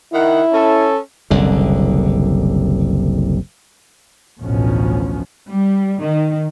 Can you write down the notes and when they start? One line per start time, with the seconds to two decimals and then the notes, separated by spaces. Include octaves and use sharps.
0.13 D#3 E4 F#5
0.52 C#4 A4
1.30 F#1 C2 D3
4.40 A1 D2 B2 F3 C#4
5.49 G3
6.01 D#3